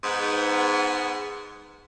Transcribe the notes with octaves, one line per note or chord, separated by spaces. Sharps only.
G#2 B3